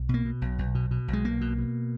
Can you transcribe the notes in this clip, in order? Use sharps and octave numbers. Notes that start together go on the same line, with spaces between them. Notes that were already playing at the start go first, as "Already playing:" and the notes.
Already playing: B1
B2
A#3
B2
B1
B1
B2
B2
B1
G#3
B1 A#3
B2
B2